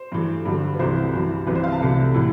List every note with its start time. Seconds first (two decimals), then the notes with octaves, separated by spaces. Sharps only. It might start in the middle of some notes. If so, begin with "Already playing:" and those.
Already playing: C5
0.12 G2 E3 A3
0.45 G2 D3 G3
0.74 B4
0.79 C2 C3 E3 A3 C5
1.14 G2 E3 G3
1.47 C2 C3 E3 B4
1.55 C5
1.64 F5
1.72 A5
1.80 C2 C3 E3 A3
2.14 A2 E3 A3